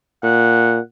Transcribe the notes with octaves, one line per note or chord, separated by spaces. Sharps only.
A#2 F#5